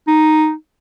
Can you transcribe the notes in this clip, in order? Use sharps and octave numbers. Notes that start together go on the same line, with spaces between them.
D#4